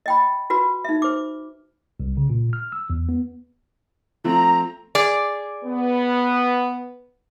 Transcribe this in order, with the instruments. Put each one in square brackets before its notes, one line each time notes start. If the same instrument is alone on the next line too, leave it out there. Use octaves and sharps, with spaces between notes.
[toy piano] D#5 G5 B5
F4 F#4 B4 B5
D#4 E5
C5 D6
[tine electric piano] C2
C#3
A#2
F6
E6
E2
B3
[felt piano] F3 A3 C4 [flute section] A#5
[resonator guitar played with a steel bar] G#4 D5
[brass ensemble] B3